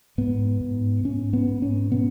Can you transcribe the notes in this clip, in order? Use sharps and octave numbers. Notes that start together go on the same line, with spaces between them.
G#2 B3
G#2
G#2 C#4
B3
G#2
C#4
B2 B3